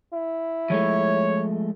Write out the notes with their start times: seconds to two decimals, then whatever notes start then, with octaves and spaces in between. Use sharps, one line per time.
0.13 E4
0.70 F3 G#3 A3 C#5